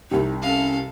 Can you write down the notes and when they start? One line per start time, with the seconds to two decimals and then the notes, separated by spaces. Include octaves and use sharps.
0.11 C2 C3 D#4
0.42 C#4 A4 F5